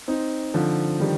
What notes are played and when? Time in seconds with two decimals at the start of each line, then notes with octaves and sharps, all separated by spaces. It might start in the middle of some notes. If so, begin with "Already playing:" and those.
0.08 C4 D#4
0.54 D3 F3
1.00 D#3 G3